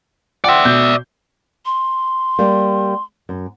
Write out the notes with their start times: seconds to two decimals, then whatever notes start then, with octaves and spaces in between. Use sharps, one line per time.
0.44 D5 E5 F#5 G5 C6
0.65 B2 G6
1.66 C6
2.39 G3 A#3
3.29 F#2